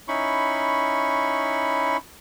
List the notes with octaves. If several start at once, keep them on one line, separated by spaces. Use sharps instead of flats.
C#4 D#4 E4 B5 C#6